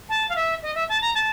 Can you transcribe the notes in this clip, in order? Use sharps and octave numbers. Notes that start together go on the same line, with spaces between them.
A5
F5
E5
D#5
E5
A5
A#5
A5